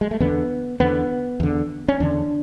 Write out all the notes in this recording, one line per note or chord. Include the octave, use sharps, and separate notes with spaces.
G#3
A3
E2 D3 B3
E2 D3 B3
E2 D3
C#4
E2 D3 D4